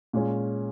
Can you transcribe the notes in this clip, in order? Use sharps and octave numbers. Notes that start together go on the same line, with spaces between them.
A#2 G#3 C#4